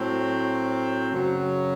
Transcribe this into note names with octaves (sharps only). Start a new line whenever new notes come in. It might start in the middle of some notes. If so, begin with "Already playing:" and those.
Already playing: A2 F#3 C4
F#2 C#3 F#3